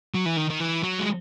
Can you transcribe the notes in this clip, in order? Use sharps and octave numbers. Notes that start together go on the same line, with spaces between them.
F#3
E3
D#3
D#3
E3
F#3
G#3